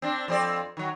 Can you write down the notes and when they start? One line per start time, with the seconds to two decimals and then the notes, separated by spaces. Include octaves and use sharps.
0.02 C4 D4
0.28 F2 C4 D5
0.77 D#3 F#3